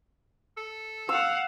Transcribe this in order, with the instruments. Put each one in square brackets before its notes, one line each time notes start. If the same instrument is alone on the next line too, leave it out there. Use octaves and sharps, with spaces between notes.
[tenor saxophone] A4
[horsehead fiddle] F5 F#5 [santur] E6